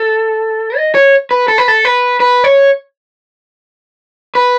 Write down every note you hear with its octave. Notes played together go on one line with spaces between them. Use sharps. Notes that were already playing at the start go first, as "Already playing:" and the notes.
Already playing: A4
D#5
C#5
B4
A4
B4
A4
B4
B4
C#5
B4